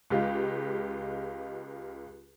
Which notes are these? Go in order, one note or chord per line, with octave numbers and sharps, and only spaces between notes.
C#2 G#3 F4 G4